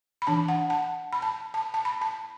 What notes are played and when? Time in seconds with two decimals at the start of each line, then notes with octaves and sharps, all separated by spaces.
0.22 B5
0.27 E3 D4 A5
0.48 F#5
0.70 A5
1.13 B5
1.22 A5
1.54 A5
1.74 A5
1.85 B5
2.01 A5